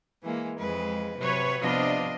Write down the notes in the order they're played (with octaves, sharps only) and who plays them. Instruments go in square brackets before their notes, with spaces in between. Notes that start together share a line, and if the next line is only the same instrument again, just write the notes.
[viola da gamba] E3 G#3 A#3
[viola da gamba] F2 B4 [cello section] G#3
[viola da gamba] C3 [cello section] F#3 B4 C#5
[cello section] C3 D4 D#5 [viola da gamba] F3 B3 F4